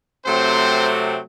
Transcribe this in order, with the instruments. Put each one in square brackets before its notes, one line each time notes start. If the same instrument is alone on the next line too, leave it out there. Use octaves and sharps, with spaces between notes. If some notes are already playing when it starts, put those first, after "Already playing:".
[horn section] C3 F#3 A3 C4 C5